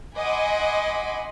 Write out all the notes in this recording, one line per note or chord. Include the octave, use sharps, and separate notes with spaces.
D#5 F#5 G#5 B5 C6 D6